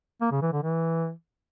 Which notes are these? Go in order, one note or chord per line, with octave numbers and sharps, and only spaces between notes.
A#3
C#3
E3
D3
E3